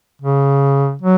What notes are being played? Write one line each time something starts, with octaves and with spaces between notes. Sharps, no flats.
C#3
F#3